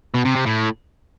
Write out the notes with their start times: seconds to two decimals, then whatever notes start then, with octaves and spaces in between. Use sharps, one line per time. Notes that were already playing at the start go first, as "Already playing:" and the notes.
0.14 B2
0.25 C3
0.35 C3
0.46 A2